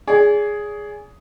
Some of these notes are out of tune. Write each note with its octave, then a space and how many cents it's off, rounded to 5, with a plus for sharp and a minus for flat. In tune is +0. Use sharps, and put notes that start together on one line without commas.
G#4 +0 D5 -40